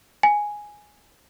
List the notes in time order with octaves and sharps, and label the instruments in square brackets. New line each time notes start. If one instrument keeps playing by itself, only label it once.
[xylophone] G#5